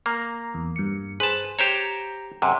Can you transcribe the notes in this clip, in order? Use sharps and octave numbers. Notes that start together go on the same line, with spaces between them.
A#3 A#5
E2
G2 C#7
G#4 B4 C5 A5
G4 C5 C#5 A#5
F#2 C3